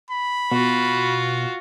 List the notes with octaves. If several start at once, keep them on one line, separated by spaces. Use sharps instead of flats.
B5
B2 F4 F#4